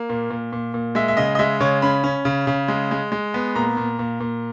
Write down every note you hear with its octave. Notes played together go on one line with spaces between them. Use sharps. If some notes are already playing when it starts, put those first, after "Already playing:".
Already playing: A#3
A#2
A#2
A#2
A#2
G#3 E5
E5
C#3 D#5
D#5
G#3 E5
C#3 C#5
C#4 B5
C#4
C#3
C#3
G#3
G#3
G#3
B3
A#2 A#5
A#2
A#2
A#2